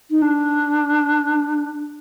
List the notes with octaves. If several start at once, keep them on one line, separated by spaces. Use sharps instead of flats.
D#4
D4